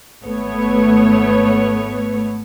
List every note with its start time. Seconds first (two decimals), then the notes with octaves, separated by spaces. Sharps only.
0.25 G#1 A3 B3 C#5